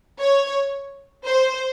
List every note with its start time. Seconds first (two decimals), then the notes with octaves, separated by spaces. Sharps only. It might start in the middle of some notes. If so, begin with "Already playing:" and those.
0.20 C#5
1.25 C5